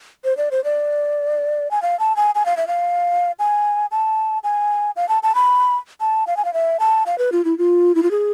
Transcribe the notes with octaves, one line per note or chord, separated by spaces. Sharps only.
C5
D5
C5
D5
G#5
F5
A5
G#5
G#5
F5
E5
F5
G#5
A5
G#5
F5
A5
A5
B5
A5
F5
G#5
F5
E5
A5
F5
B4
F4
E4
F4
E4
F4
G#4